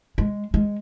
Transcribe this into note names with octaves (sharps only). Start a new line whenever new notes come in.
G#3
G#3